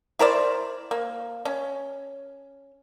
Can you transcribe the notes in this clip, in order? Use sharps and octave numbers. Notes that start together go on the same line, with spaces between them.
E4 A#4 C5 D5
A#3
C#4